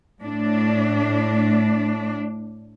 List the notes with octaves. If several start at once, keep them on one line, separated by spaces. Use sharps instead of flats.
A2 D4